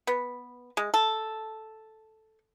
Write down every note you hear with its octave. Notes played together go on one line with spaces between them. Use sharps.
B3
G#3
A4